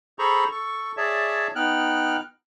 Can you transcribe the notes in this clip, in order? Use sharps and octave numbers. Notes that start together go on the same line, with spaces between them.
G#4 A4 C5 A#5 B5 C#6
A4 C#6
G#4 C#5 D5 E5 A5
B3 D#4 G5 F6 F#6